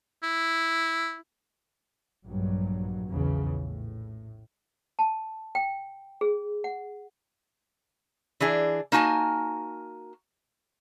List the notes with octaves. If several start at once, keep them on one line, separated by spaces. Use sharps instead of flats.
E4
A#1 G2 F#3
A#1 E2 C#3 E3
A2
A5
G5
G#4
F#5
E3 D4 G#4
A#3 D#4 F#4 G#5 A5